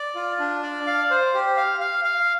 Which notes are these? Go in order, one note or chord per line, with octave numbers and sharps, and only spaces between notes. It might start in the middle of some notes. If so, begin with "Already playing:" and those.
Already playing: D5
F4
D4
D5
F5
C5
G4
F5
F5
F5